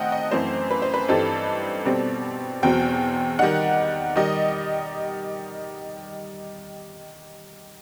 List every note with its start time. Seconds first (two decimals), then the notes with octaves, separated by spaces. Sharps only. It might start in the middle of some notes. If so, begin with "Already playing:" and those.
Already playing: D#3 A3 C4 D#4 D#5 F#5 G5
0.12 D#5
0.31 F#2 E3 A3 C4 C5
0.71 B4
0.82 C5
0.94 B4
1.08 G2 E3 G3 C4 D#4 A4
1.85 B2 G3 C4
2.63 E2 B2 F#3 C4 G5
3.39 D#3 G3 D#4 F#5
4.16 D#3 G3 D#5